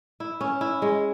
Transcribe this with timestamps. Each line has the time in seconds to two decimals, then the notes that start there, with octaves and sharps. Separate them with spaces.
0.20 E4
0.41 C#4
0.61 E4
0.82 G#3